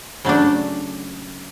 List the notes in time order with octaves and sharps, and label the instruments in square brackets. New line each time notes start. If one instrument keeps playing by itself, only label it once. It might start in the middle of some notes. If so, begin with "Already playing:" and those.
[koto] C#3 F#3 A3 D4